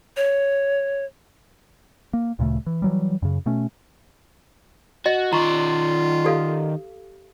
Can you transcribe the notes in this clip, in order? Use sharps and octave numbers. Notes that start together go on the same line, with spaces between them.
C#5
A#3
D2 A#2 C#3 A3
E3
E3 F#3 G3
F#2 C#3
B2 A3 C#4
F#4 D#5
D#3 F4 D5 A#5 C#6
G4 A4 F5